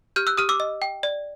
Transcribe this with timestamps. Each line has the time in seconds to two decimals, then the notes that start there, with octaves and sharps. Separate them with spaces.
0.16 G4 F6 G6
0.27 E6 F#6
0.37 G4 D#6 F6
0.49 D6 E6
0.60 D#5
0.82 G5
1.03 D5